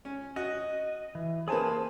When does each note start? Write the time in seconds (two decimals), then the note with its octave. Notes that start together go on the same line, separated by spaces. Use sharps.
0.05 C#4
0.36 F#4 D#5
1.15 E3
1.48 A#3 G#4 B4 C5 G#5 A5